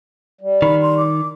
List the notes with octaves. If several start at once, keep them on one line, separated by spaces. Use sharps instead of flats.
G3
D#3 B5
C6
D6